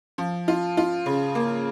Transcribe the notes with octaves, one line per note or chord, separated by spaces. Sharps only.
F3
F4
F4
C#3
A#3